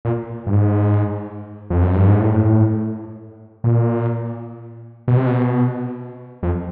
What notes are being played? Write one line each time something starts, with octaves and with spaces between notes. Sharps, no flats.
A#2
G2
G#2
F2
F#2
G2
G#2
A2
A#2
B2
C3
B2
F2